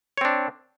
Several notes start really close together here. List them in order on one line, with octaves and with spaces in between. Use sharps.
C#5 C4 D4